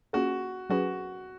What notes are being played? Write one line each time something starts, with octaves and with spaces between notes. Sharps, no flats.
A#3 C#4 F4 F#4 G#4
F#3 C#4 F#4 G#4 B4